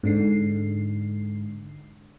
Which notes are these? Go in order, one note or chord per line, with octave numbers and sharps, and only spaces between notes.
G#2 D3 C7